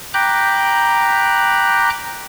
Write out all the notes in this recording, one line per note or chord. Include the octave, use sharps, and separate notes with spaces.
G5 A#5 B5 D6 F#6 G6